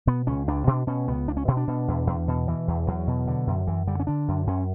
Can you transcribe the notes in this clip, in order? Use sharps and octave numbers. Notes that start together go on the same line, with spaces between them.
B2 B3
C#2 C#4
C#2 D4
B2 D4
B2 C#4
C#2 B3
C#2 D4
C#4
B2 C#4
D4
B2
E2
E2
B2
B2 E3
E2
E2 F#3
B2
D3
F#2
F#2 E3
D3 G3
C#4
D3 D4
F#2
F#2 C#4